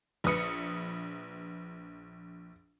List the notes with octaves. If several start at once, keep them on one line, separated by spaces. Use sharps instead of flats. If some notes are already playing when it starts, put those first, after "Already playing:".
A#1 B4 D#6 C#7